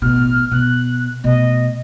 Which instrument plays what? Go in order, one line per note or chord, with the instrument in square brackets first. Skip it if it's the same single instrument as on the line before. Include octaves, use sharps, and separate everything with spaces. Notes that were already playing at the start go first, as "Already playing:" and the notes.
[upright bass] A1 B2 [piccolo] F6
[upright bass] B2 [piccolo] F#6
[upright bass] B2 A3 [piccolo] D#5